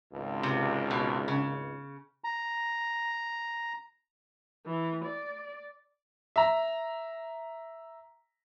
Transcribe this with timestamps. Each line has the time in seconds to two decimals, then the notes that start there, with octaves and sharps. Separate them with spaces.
0.13 G#1 C#2
0.43 C3
0.91 B2
1.28 C#3
2.24 A#5
4.66 E3
5.05 D5
6.36 E5 A#5